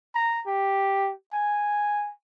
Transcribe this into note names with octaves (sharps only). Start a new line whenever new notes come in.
A#5
G4
G#5